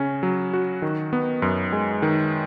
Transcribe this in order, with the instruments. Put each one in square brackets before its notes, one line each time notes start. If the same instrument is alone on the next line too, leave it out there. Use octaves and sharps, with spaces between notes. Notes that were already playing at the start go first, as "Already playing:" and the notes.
Already playing: [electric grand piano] C#3 C#4
F#3
F#4
D#3
B3
F#2
G#3
D#3